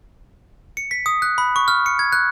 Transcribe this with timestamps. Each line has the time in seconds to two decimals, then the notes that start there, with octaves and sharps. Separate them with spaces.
0.77 C#7
0.91 B6
1.06 D#6
1.22 F#6
1.38 B5
1.56 C#6
1.68 F6
1.86 C#7
1.99 G#6
2.13 F#6